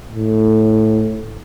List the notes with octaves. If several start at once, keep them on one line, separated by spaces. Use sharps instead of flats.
A2